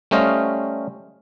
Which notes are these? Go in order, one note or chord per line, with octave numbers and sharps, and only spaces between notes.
G3 A3 C#4 C5 D#5 F5